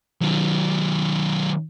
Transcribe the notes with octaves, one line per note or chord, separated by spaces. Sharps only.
D#3 F#3